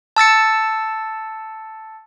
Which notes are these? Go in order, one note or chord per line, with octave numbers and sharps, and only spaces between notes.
A5 E6 A6 C#7